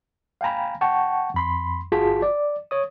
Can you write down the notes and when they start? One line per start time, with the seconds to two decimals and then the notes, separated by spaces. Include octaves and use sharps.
0.41 F5 G5 G#5 A#5 B5
0.81 F#5 G5 A5 C#6
1.34 F2 B5 C6
1.92 G1 F4 F#4 G#4 A5 B6
2.22 D5
2.71 C#5 D#6